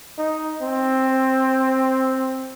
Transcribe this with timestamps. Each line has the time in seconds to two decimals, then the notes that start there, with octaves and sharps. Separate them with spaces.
0.18 D#4
0.62 C4